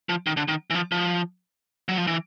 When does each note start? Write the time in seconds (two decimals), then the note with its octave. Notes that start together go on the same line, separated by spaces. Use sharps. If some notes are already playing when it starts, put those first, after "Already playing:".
0.09 F3
0.27 D#3
0.37 D3
0.48 D#3
0.70 E3
0.75 F3
0.92 F3
1.88 F#3
1.98 F3
2.07 E3